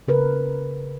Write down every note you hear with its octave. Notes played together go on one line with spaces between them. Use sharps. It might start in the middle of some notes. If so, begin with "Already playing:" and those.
C#3 A#4 B4